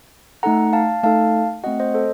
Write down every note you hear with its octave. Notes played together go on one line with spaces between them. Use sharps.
A3 D#4 A4 F#5 A#5
F5 A5
A3 D#4 A4 F5 A5
A3 C4 F#4 D#5 F#5
C5 D#5
A4 C5